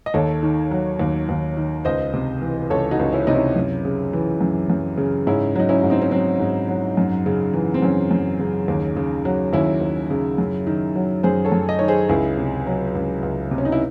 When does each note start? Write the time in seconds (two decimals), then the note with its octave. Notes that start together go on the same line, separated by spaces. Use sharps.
0.06 D#5
0.14 D#2 A4 C#5
0.43 D#3
0.71 F#3
0.99 D#2
1.29 D#2
1.57 D#3
1.85 C#2 C5 D#5
2.14 C3
2.41 E3
2.70 C#2 A4 C#5
2.91 D#4 F#4
2.99 C#2
3.13 C#4 E4
3.27 C3 D#4
3.34 C#4 E4
3.56 F#2
3.85 C#3
4.13 E3
4.41 F#2
4.70 F#2
4.98 C#3
5.27 G#2 C#4 E4
5.55 F#3 D#4
5.69 C#4 E4
5.83 G#2
5.90 C4 D#4
6.02 C#4
6.11 F#3 C4
6.40 G#2
6.68 F#3
6.97 F#2
7.26 C#3
7.54 E3
7.74 C4
7.82 F#2 C#4
8.11 F#2
8.40 C#3
8.68 D#2
8.96 C#3
9.25 F#3
9.53 D#2 C#4 E4
9.81 D#2
10.10 C#3
10.38 F#2
10.67 D#3
10.95 F#3
11.23 F#2 G#4 C5
11.45 A4 C#5
11.52 F#2
11.69 D#5
11.79 D#3 C#5
11.88 G#4 C5
12.09 C#2 E4 G#4
12.37 C3
12.67 F#3
12.95 C#2
13.23 C#2
13.51 C3
13.58 C#4
13.65 D#4
13.72 E4